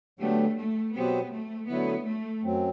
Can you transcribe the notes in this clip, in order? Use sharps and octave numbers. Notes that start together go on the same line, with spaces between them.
D3 F#3 A3 B3 D4 G4
A3
B2 F#3 B3 C4 G4 C5
A3
D3 F#3 A3 B3 E4
A3
F#2 F#3 C4